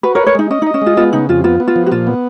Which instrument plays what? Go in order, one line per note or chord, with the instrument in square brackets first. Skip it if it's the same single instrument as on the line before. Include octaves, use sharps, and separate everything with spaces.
[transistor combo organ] F#4 [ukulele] B4
[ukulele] A#4 C#5
[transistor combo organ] B4
[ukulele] A#4 C#5
[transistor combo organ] G#3 [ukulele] D#4
[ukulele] C#4 [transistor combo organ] D#5
[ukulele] D#4
[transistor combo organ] D#5
[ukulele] C#4
[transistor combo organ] G#3 [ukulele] F4
[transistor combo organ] B3 [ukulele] F4
[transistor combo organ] C#3 [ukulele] D#4
[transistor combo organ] F2 [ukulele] F4
[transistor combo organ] B3 [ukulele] F4
[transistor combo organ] B3
[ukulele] F4
[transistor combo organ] F3
[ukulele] F#4
[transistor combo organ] A#2 [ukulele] F4
[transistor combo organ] B3